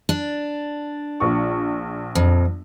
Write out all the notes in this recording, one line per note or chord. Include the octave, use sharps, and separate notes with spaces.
D4
A#1 F4 C#6
F2